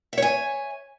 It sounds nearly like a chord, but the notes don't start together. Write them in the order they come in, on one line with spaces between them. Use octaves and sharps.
E5 C#5 G#5